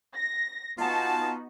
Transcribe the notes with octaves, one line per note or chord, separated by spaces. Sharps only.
A#6
B3 D#4 F4 F#4 G#5 A5